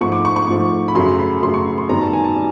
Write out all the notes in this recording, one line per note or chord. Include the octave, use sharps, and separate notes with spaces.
G#2 F3 A3 C#6
D6
C#6
C#6
G#2 F3 A3
B5
F#2 C#3 F#3 A3 C6
B5
F#2 C#3 F#3 A3 C6
C#6
C6
F#2 D#3 G3 B3 A#5
A5
G#5
A5
G3